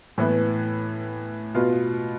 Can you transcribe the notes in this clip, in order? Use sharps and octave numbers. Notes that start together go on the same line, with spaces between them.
A2 E3 B3 E4
B2 B3 F4